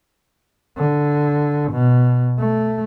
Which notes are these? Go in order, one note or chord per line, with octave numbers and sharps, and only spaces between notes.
D3
B2
A3